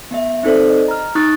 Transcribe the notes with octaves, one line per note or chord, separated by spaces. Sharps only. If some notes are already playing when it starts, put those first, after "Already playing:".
B3 E5
C4 D#4 A4 C5 D5
D#5
A#5 F6
D#4 C#6 D#6 F#6 A6